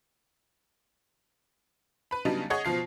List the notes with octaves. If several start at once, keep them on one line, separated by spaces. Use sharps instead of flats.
B4 B5
C#3 F#3 G3 B3 D4 D#4
G#4 C#5 D#5 F#5
B2 F3 F4 C7